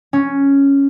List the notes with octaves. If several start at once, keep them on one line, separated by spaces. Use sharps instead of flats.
C#4